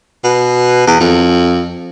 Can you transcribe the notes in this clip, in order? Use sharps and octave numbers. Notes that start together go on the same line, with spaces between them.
B2
E2
F2